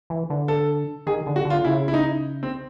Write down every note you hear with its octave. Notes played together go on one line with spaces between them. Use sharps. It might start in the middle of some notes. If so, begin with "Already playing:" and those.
E3
D3
A4
D#3 G#4
D3
F#4
D3
F4
C#3 E4
E4
D#4
C4